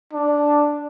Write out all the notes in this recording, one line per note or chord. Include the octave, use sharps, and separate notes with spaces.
D4